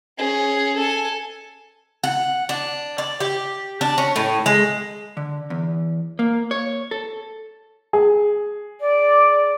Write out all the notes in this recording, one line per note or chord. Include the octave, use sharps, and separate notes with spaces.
C#4 G#4
A4 G#5
F#5
D4
D5
G4
D4
C#4
A2
G#3
D3
E2
A#3
C#5
A4
G#4
D5